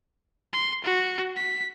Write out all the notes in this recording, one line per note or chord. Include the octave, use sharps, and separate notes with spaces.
C6
F#4
B6